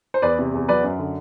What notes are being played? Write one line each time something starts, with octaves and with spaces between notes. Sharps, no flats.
C5
E2 B4 D5
C3
E2
F#3 B4 D5
F#2
D3